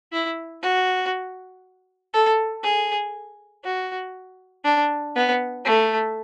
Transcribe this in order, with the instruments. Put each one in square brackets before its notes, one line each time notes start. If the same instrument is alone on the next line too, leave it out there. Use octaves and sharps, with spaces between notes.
[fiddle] E4
F#4
A4
G#4
F#4
D4
B3
A3